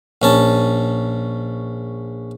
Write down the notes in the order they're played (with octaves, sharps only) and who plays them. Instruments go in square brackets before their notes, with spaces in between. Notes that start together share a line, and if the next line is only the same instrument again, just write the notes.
[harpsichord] A#1 C#4 A5